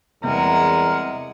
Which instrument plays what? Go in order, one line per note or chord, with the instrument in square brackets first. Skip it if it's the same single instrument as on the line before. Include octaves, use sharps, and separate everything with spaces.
[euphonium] E2 [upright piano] C3 G3 [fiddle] G#3 F#5 [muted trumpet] A#4